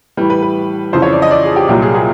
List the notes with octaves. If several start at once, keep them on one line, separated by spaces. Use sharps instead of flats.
A2 E3 G3 B4
B4
B4
F2 C#3 E3 C5
C#5
D5
D#5
D5
G#4
G4
C2 A#2 F#3 G4
G#4
G#4